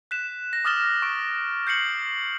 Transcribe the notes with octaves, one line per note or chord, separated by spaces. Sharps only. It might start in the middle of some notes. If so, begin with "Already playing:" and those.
F#6 B6 E7
A#6
D6 D#6 F6 A6 E7 G7
C#6 D7
G6 C7 C#7 F#7